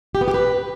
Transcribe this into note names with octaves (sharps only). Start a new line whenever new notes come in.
G4
B3
G4
B4